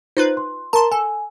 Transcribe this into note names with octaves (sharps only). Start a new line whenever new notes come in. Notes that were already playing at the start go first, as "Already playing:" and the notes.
D#4 F4 B4 C5
C6
A#4 A5 A#5 C6
A4 G#5